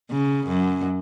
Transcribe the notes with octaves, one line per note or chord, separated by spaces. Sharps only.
C#3
F#2